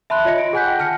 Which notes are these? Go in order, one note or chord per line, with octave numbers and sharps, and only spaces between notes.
E5 A5 B5 C6 F#6
F4 C#5 D#5 A#6 C#7
D7
G#4 F#5 G#5 F#6 G6 B6
F#5 G5
A5 F6 A#6 C#7